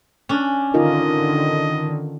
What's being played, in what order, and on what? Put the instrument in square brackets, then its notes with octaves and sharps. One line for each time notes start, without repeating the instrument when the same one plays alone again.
[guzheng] C#4 D4
[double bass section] D3 D#3 [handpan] D#4 F4 A#4 [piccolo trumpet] D#5